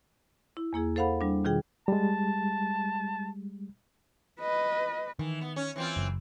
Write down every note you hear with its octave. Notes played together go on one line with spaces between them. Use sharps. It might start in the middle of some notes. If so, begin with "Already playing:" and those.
E4
E2 A#3 E4 G#4
A4 C5 F5 F#5 B5
G3 D4
B2 D#3 F4 G#4 G5
G3 G#3 A5
B4 D#5
D#3 E3
B3
C#4
E3 C4 F4
F#1